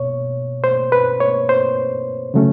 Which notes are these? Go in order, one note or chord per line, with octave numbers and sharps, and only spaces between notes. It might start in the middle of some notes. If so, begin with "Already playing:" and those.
Already playing: B2 C#5
C5
B4
C#5
C5
C#3 F#3 A3 C#4